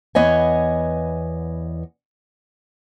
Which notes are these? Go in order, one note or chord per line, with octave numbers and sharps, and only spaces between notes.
E2 B3 C#5 D#5 G#5